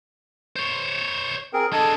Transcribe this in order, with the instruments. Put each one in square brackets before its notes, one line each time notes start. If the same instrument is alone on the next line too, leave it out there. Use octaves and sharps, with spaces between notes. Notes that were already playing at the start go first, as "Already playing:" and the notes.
[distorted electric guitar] C5 C#5
[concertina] C4 G#4 A#4
[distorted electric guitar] D4 G#4 [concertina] A4 D#5 A5